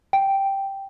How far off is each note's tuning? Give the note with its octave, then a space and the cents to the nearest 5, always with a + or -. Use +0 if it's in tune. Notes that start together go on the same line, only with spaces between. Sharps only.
G5 +0